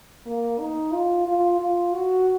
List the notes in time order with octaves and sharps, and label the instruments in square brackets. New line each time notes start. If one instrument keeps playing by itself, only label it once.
[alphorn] A#3
D#4
F4
F4
F4
F#4